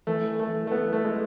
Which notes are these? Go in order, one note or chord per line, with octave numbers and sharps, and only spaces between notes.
E3 A3
A3
A3
B3
A3
G#3